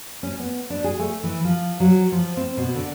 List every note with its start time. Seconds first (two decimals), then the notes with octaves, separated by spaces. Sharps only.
0.23 C#4
0.39 B3
0.70 D4
0.84 G#4
0.99 A3
1.23 E3
1.44 F3
1.80 F#3
2.12 F3
2.37 C4
2.57 B2
2.75 D3